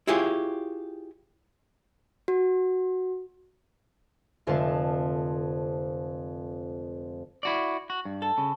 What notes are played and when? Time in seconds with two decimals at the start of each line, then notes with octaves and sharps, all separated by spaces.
0.07 E4 F4 G4 G#4 C#5
2.28 F#4
4.47 F1 F2 D3 G#3 F5 A5
7.43 E4 F#4 D5
7.90 F#4
8.05 G2
8.22 A4
8.38 C#3